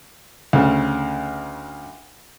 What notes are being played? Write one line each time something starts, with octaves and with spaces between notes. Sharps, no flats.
D2 C#3